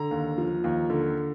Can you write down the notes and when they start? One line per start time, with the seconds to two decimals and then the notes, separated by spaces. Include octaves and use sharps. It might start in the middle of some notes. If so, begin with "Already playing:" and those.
Already playing: D3 A#5
0.11 D#2
0.38 F3
0.64 D#2
0.90 D3